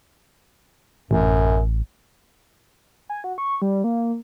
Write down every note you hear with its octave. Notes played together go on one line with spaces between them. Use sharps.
A1 F#2
G#5
F#4
C#6
G3
A#3